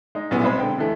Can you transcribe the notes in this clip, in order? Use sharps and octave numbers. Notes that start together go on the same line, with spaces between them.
G#3 D#4
D#1 B1 F#2 B3 E4
C2 G#3 C5 B5 C6
D3 G5
D2 E3 A3